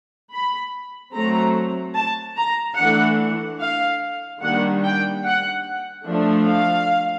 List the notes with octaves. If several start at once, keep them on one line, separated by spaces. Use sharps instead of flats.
B5
F#3 A3 C4 A#5
A5
A#5
E3 A3 D4 F#5
F5
D#3 G3 A#3 D4 F#5
G5
F#5
F3 A3 D4
F5